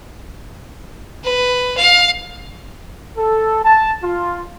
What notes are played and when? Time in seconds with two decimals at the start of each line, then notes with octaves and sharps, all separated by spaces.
1.24 B4
1.78 F5
3.17 A4
3.64 A5
4.03 F4